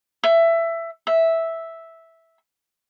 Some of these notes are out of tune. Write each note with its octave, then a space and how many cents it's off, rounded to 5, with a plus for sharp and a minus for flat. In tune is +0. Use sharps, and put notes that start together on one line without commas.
E5 +15
E5 -5